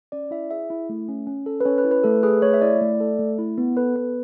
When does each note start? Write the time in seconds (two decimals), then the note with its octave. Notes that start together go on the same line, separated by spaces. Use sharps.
0.12 C#4 D5
0.31 E4 E5
0.51 G#4 E5
0.70 E4
0.89 A3
1.09 C#4
1.27 C#4
1.46 A4
1.60 B4
1.65 C#4 C#5
1.78 B4
1.85 E4
1.91 B4
2.04 A3 A4
2.23 G#4 B4
2.42 A3 C#5
2.54 E5
2.62 E4 D5
2.81 A3
3.00 A4
3.19 A3
3.39 E4
3.58 B3
3.77 A4 B4
3.96 B3 B4